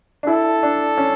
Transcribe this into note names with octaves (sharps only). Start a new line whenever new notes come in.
D4
E4 A4
D4
C#4